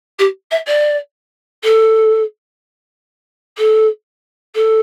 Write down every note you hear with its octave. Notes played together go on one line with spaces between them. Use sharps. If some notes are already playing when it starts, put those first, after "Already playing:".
G4
E5
D5
A4
A4
A4